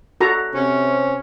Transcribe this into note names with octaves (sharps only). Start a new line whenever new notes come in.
F#4 A4 A#5
C3 C#4